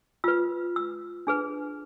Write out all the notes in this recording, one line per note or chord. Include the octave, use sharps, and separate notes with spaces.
F4 B4 E6
E6
D4 G#4 B4